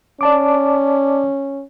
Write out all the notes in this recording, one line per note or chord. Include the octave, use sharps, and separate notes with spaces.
C#4 D5 A5 D6